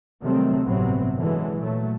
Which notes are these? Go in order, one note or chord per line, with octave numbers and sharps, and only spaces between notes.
C3 D#3 F#3 G3 A3 C4
G1 A2 C3 F#3 B3 C4
D3 E3 F#3 G#3
A#2 F#3 A3